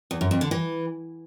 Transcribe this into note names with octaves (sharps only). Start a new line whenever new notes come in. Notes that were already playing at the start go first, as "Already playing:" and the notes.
E2
F#2
F2
D3
E3